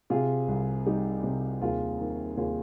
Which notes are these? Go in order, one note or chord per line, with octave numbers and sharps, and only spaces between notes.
C3 F4 G#4
C2
G3 D#4 G4
C3
D#2 F4 G#4
D#3
D#2 F4 G#4